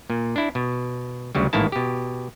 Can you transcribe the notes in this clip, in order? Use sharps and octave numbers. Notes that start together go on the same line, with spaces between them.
A#2
D4 E4
B2
D2 C#3 F#3 G3
A1 G#2 D#3 A#3 E4 A5
B2 G4